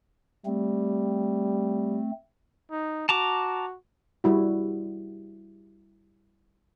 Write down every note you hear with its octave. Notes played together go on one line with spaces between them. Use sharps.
G3 A3 C4
D#4
F#4 A5 A#5 D6
G3 E4 F#4